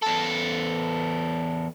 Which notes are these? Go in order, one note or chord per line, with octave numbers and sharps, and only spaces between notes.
E2 A4